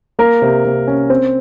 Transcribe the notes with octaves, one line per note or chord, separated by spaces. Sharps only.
A#3 A#4
C3
C3
C#4
C4